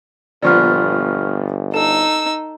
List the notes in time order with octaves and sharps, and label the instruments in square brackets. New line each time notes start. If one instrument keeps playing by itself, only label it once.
[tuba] G1 [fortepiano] A#2 F3 B3 [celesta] D5 C#6 F6
[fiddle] D#4 E6 [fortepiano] A4 [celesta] E7